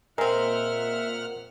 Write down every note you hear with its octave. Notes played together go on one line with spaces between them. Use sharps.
A#2 G#3 C4 A#4 E5 F#5 F6